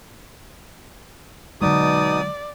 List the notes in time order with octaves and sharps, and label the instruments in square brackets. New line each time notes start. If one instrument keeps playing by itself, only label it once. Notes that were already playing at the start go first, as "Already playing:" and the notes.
[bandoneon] B2 B3 D#6 [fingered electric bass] D3 F#3 G#3 [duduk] D#4 [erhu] D5